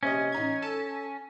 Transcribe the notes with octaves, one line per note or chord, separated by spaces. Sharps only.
A#1 C3 C#4 D#5
A1 D#4 G#6
A4 A5 D#7